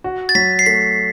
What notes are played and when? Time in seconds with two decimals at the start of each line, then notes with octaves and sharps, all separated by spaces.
0.04 F#4
0.29 A6
0.35 F#3 B6
0.59 C7
0.66 A3 B6